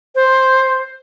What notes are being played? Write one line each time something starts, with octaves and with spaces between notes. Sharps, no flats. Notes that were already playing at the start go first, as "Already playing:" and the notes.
C5